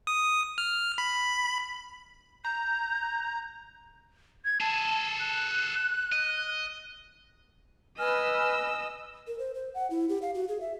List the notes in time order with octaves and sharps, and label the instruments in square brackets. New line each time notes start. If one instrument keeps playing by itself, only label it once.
[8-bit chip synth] D#6
F6
B5
[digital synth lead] A#5 [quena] G6
[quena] G#6
[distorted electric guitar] G#4 A4 [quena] A5
[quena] F#6
[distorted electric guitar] D#5
[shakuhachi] B4 [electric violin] D#5 E6 [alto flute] G#5 [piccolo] F6
[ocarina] A#4
C5
C5
F#5
E4
G4
F5
F#4
G#4
E5